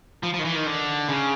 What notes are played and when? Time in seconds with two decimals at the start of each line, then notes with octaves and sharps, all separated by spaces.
0.23 F3
0.34 F3
0.39 D#3
0.45 E3
0.55 D#3
0.66 D3
1.09 C#3